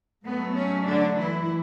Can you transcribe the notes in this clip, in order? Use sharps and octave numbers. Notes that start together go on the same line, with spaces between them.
G#2 F#3 A3 B3
C#4
D3 D4
E3 E4